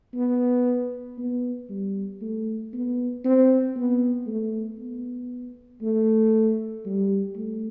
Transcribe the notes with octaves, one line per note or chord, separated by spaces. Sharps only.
B3
B3
G3
A3
B3
C4
B3
A3
B3
A3
G3
A3